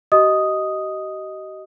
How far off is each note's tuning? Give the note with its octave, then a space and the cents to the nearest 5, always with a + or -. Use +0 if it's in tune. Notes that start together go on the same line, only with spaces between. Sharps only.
G4 -45 D#5 +5 D#6 +0